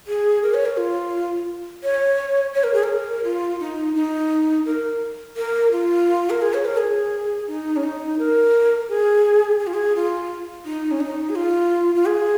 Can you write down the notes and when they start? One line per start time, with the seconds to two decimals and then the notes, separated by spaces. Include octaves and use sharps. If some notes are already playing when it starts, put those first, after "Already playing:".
0.07 G#4
0.43 A#4
0.54 C#5
0.66 A#4
0.77 F4
1.83 C#5
2.54 C#5
2.64 A#4
2.73 G#4
2.83 A#4
3.24 F4
3.60 D#4
3.95 D#4
4.66 A#4
5.37 A#4
5.72 F4
6.30 A#4
6.42 G#4
6.54 C#5
6.65 A#4
6.77 G#4
7.48 D#4
7.76 C#4
7.83 D#4
8.19 A#4
8.89 G#4
9.60 G#4
9.67 F4
9.74 G#4
9.96 F4
10.65 D#4
10.91 C#4
11.00 D#4
11.29 G#4
11.36 F4
11.95 F4
12.07 G#4